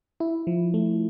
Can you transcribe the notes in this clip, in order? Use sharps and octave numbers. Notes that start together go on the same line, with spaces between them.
E4
F3
A3